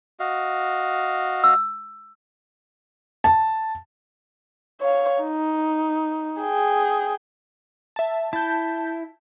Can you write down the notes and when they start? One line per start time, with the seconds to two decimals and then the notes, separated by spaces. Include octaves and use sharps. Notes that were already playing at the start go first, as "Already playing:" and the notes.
0.20 F#4 D#5 F5
1.44 E6
3.24 A5
4.81 C#5 F5
5.22 D#4
6.41 G#4 G5
7.96 E5 A5
8.33 E4 A5 G6